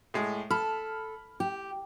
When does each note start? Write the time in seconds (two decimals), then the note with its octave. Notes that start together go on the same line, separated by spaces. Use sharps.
0.14 A2 G#3
0.51 A4 B5 F6
1.40 G4